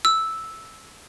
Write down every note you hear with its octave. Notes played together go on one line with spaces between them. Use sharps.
E6